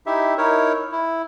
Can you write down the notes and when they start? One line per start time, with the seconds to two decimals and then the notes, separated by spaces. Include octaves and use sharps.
0.06 D#4 E4 G4 E5
0.37 D#4 E4 A#4 C#5
0.92 E4